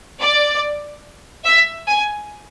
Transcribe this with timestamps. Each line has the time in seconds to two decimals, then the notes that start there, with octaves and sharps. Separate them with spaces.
0.20 D5
1.45 E5
1.88 G#5